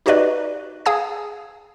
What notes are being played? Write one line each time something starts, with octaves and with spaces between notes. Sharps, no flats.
D#4 F#4 G4 B4 D5 D#5
G#4 F5 G#5 D#6 E6 G#6